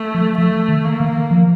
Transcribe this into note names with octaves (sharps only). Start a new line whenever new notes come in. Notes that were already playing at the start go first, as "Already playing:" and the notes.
Already playing: A3
F3
F3 A3
D#3
A#3
D#3
F3